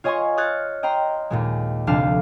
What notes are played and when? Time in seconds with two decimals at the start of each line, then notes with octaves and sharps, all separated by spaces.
0.04 F4 C#5 D#5 G#5 C6 C#6
0.37 D#6 F6 F#6 G#6 A6 C#7
0.83 D#5 G5 A#5 C6
1.30 D#2 A#2 G#3
1.87 F1 D2 D4 F5 A5 F6